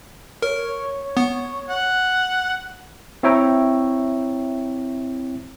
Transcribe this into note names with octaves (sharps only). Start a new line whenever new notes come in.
A#4 C#5
B3
F#5
C4 E4 C#5 E5 G5 A#5